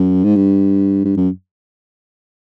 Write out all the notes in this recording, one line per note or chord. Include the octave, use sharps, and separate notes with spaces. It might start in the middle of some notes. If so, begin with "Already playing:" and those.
Already playing: F#2
G#2
G2
G2
F#2